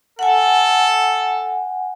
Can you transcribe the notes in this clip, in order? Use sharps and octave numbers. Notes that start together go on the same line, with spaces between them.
A4 F#5 G#5